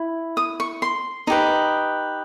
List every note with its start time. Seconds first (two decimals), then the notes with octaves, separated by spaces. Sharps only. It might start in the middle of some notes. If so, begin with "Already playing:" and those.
Already playing: E4
0.37 D#6
0.60 C#6
0.82 C6
1.27 D#4 G4 B4